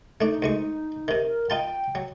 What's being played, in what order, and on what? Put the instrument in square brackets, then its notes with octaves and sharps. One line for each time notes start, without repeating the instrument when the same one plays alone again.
[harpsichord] A3 D4 [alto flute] D#4
[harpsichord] D2 G#3 C#6
C3 D#3
[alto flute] A#4
[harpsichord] D#4 F4 A5 [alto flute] G5
[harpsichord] F#3